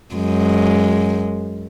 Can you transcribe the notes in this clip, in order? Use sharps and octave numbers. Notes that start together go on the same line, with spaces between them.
F#2 G#3